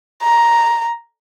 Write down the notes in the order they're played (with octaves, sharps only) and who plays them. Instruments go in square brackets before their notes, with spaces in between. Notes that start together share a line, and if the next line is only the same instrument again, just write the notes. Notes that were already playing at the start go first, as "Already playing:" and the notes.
[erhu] A#5